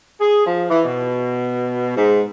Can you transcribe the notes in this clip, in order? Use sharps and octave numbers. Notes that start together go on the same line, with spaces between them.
G#4
F3
E3
B2
G#2